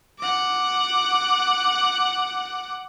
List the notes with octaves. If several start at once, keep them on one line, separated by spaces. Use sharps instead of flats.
F#5 D6